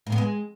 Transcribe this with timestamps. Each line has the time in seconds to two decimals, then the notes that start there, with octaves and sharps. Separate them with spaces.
0.07 A2
0.12 B3
0.18 G#3